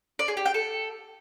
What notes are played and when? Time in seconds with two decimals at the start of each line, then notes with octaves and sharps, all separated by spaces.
0.19 D5
0.28 G#4
0.37 G4
0.46 G5
0.54 A4